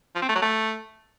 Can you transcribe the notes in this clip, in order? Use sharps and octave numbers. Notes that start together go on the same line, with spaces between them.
F3
C4
A3
F#3
A3